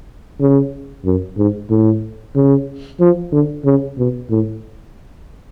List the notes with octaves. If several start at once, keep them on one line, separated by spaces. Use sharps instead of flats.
C#3
F#2
G#2
A2
C#3
F3
D3
C#3
B2
A2